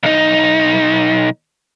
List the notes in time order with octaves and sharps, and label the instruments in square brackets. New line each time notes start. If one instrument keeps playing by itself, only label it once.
[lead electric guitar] B1 D#4